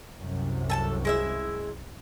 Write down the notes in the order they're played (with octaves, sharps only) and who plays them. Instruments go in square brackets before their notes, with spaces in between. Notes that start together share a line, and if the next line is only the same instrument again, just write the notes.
[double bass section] C2 F#2 C3
[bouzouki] A4 G#5 A5
G#3 E4 E5